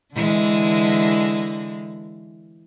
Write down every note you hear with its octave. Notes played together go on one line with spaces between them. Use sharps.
D3 E3 G#3